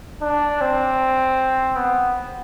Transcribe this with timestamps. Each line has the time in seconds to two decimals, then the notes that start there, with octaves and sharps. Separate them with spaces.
0.22 D4
0.61 C4
1.76 B3